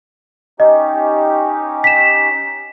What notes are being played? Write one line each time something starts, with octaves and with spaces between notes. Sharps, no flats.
C#4 D#4 G4 D#5
B6 E7